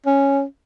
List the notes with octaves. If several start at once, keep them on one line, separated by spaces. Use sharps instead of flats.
C#4